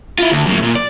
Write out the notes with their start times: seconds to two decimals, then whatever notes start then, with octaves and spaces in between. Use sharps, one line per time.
0.18 E4 F4
0.31 D2
0.47 F#2 A2
0.63 A#2
0.75 D5